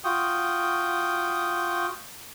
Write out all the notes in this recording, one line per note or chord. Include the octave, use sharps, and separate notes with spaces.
F4 F#4 G5 D#6